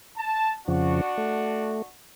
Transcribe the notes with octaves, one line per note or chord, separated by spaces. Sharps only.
A5
F2 C#3 F3 D4 F#4
A3